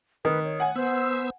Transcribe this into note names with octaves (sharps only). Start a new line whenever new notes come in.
D#3 B4
C#5
F#5 G#5
B3 C5 E6